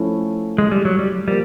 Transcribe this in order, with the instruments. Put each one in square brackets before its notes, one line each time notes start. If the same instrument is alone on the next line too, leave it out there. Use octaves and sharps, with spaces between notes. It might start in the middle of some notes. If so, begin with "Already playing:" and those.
Already playing: [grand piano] F3 A3 C#4 E4
[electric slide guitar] G#3
G3
F#3
G3
[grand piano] F3 A#3 [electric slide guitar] G3